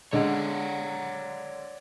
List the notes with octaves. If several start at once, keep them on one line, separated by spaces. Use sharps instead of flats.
D3 G#3 C#5 D5 F#5